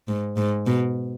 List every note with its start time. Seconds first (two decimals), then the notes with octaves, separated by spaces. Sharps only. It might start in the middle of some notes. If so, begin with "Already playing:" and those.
0.08 G#2
0.37 G#2
0.66 B2